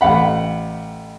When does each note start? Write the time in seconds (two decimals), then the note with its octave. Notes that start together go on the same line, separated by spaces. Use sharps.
0.01 A1 F5 F#5 B5